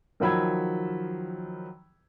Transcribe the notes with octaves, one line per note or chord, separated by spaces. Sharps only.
D#3 F3 F#3 B5 E6 G#6